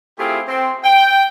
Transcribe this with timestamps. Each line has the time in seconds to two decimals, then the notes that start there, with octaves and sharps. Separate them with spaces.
0.18 A3 C4 E4 F4 G4 G#4
0.48 C4
0.84 G5